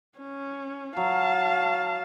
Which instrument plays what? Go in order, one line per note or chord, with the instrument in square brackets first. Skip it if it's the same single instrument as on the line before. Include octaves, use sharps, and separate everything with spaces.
[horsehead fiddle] C#4
[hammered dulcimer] F#3 [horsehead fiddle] F5 A5